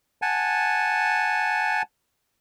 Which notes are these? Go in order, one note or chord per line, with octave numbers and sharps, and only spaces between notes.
F#5 G#5 A5